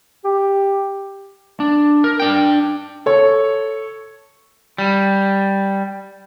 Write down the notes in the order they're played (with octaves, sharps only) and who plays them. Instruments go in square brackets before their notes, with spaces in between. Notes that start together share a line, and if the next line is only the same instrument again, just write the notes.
[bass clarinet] G4
[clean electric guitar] D4
A#4
D4 G5
[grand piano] A4 C#5
[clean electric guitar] G3